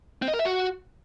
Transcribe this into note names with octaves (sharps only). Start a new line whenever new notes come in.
C4
D#5
A#4
E5
F#4